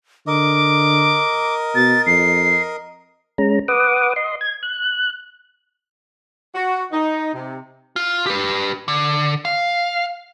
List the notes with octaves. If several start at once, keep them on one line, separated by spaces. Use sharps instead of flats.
D3 A#4 D#5 D6
B2 A6
F2 C7
G#3 C#4 A#5
B4 F#5 D6 D#6
D#5 C6
G#6
F#6
F#4
D#4
C3
F4
G4 B4
D3
F5